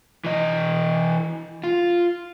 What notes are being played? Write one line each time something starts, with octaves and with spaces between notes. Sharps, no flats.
E3 D#5
F4